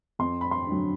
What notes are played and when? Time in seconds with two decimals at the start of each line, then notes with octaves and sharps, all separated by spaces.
0.19 F2 C6
0.41 B5
0.51 C6
0.67 D3 F#3